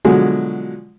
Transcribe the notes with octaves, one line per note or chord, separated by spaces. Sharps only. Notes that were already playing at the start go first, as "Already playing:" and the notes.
B2 D3 F3 F#3 G#3